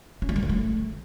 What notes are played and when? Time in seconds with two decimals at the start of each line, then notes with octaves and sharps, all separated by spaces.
0.22 C#4
0.29 G3
0.36 D#3
0.43 D3
0.49 A3